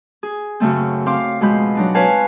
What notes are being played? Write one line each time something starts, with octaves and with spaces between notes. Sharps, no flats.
G#4
F#2 C#3 A3 C4
C4 F5 C6 D6
F2 B2 G#3 F5 B5 G6
F#3 D4 D#4
C4 B4 C#5 F5 G#5 A5